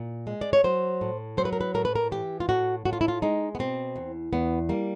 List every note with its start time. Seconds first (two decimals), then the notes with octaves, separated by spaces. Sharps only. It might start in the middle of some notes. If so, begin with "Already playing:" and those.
Already playing: A#2
0.27 G#3
0.41 D5
0.53 C#5
0.64 F#3 C5
1.01 A2
1.37 F#3 C5
1.45 B4
1.53 A#4
1.61 B4
1.74 A2 A#4
1.85 B4
1.95 A#4
2.12 E3 G4
2.40 F4
2.49 A2 F#4
2.85 A2 F#4
2.93 F4
3.01 E4
3.08 F4
3.22 G#3 D#4
3.55 B3
3.59 B2 C4
3.96 E2
4.33 E2 B3
4.69 G3 A#3